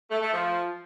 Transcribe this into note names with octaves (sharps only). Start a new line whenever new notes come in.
A3
A3
F3